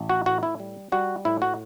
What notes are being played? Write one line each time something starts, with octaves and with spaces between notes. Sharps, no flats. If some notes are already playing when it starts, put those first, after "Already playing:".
Already playing: A1
F#4
A2 F#4
E4
G3
G3 F#4
A2 E4
F#4